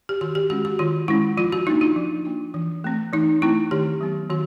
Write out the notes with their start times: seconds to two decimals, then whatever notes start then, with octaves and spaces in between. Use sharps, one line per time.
0.09 G4
0.21 D#3 F#4
0.35 G4
0.50 G#3 C#4 F#4
0.65 F#4
0.79 D#3 F4
1.08 G#3 C#4 E4
1.37 F3 F4
1.52 F#4
1.67 A#3 D4 D#4
1.81 F4
1.96 F3
2.25 A#3 D4
2.54 E3
2.84 A3 C4
3.13 E3 D#4
3.42 A3 C4 E4
3.71 D#3 G4
4.01 F#3 B3
4.30 D#3 F#4